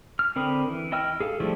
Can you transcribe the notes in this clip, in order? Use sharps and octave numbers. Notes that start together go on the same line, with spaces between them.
F6
D3 C4 A#4 B5 D#6
E3
E4 D#5 G5 E6 F6
G#4 A4 F5
F3 G3 A3 D4 E4